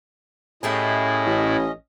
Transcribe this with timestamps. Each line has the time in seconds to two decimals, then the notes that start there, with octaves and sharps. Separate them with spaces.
0.63 A2 A3 C#4 E4 G4 G#4 D#5
1.26 A1